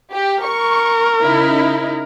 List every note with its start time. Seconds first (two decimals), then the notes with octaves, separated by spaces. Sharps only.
0.12 G4
0.43 A#4 C#6
1.23 C#3 D#4 E4